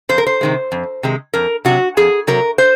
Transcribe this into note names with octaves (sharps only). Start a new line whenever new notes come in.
F2 C5
A#4
C5
C3 D#3 G#3
F2
C3 D#3 G#3
F2 A#4
C3 F#3 F#4
F2 G#4
C3 F#3 A#4
C5